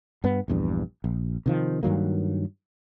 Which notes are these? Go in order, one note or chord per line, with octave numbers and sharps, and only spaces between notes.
G2 B3
A#1 E2 G2
A#1
C3 D#3 F3
G2 D#3 F#3 A#3